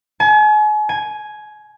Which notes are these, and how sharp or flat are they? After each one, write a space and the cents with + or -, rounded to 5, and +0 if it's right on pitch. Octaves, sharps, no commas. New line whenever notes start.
G#5 +40
G#5 -5